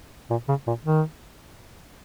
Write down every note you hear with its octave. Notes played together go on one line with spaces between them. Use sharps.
A#2
C#3
A#2
D#3